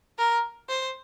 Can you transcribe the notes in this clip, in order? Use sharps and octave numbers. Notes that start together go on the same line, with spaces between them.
A#4
C5